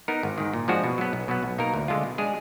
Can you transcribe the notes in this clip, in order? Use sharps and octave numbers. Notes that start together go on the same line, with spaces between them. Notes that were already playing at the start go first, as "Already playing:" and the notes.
B3 D#4 A#4
G#1
G#2 D#3
A#2
F3 G#3 D4 F#4
B2
F#3 B3
B1
B2 F#3 B3
B1
B2 A#3 D#4 A#4
D2
D3 G#3 D4 F4
B2
G#3 D4 G#4